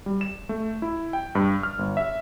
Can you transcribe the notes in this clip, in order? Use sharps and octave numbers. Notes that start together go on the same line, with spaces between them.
G3
E7
A3
E4
G5
G2
F6
G1
E5